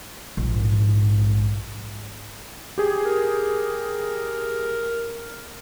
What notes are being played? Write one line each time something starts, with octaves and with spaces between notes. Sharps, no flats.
A#1 G#2
G4 G#4
A#4